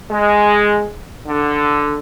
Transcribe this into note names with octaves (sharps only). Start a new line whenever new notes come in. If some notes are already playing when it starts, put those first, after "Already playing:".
G#3
D3